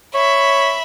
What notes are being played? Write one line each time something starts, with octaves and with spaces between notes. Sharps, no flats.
C#5 E5 B5